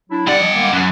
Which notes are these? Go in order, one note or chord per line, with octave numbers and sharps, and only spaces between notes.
F#3 D4 E4
G2 D4 G4 D5 F#5
F3 D#5
D#3 G#3 A#3
F#2 F#5